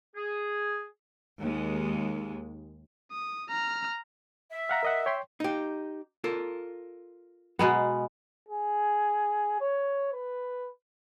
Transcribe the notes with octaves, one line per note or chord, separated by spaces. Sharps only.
G#4
D#2 G#3
D#6
A#5 F6
E5
F5 F#5 A#5
A#4 D#5 F#5
C#5 G5 C6
D#4 G4
F4 A4 A#4
B2 G#3 B3 F#5 G#5 A#5
G#4
C#5
B4